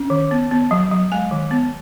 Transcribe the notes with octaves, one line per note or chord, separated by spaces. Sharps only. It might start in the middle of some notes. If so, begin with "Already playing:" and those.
Already playing: C#4
D#3
B3
B3
F#3
F#3
G#3 G#5
D#3
B3